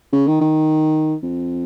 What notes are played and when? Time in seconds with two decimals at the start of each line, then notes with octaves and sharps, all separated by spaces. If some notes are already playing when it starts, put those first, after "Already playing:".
0.13 C#3
0.28 D#3
0.41 D#3
1.23 F2